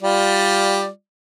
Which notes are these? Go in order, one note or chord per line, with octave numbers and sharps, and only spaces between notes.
G3 F4 D5